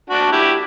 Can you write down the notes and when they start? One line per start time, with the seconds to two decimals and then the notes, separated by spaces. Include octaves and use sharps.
0.10 D4 F#4
0.32 E4 G4